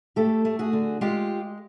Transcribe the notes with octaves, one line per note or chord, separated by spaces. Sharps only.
A3 G4 A4
A3
F#4 G#4
D3
G#3 F4 G4